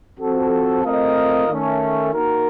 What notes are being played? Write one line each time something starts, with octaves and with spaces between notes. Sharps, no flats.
F3 C4 F#4 A4
A3 C4 F4 A#4 D#5
D#3 A3 C#4
A#3 D#4 F#4 A#4